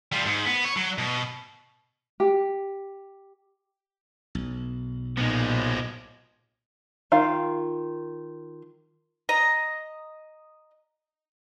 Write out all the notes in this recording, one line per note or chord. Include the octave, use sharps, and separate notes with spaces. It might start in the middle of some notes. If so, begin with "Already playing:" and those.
G3 F4
G#2
B3
C#5
F#3
B2
G4
B1
A#2 F3 G#3 B3 D#4
D#3 F4 F5
D#5 A#5